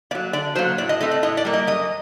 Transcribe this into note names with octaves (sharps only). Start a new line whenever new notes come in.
F#3 A#3 D5
D3 D5
F#3 A#3 C5
A2 D5
D#5
A3 C4 D#5
D5
A2 D#5
D5
G3 A#3
D#5
F#2 D#5